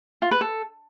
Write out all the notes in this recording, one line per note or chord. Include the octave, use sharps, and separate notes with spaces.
F4
B4
A4